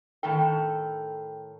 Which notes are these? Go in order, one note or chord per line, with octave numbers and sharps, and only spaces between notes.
A2 D#3 A4 G5